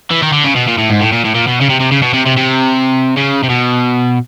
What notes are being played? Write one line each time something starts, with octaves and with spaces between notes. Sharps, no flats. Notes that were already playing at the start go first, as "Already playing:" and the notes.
E3
D#3
D3
C#3
B2
A#2
A2
G#2
A2
A#2
A2
A#2
B2
C#3
C3
C3
C#3
B2
C3
C3
C3
C#3
C3
B2